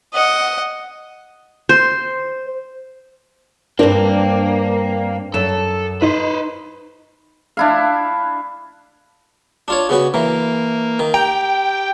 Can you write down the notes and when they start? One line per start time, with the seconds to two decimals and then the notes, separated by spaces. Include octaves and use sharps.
0.14 D#5 F#5
1.69 C5
3.79 G2 A#3 C4 D4 A#4
5.34 F#2 A4
6.02 D#4 B4 C5
7.57 D4 E4 F5
9.68 D4 F4 C#5
9.89 C#3 B3 F#4
10.14 E3 A#3
10.99 D#3
11.14 G4 G5 A#5